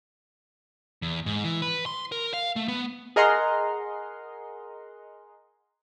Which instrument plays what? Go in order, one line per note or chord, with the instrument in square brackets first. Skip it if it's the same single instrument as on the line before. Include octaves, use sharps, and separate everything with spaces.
[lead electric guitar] E2
G#2
E3
B4
C6
A#4
F5
A3
B3
[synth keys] G#4 A#4 D#5 F#5 A#5 C6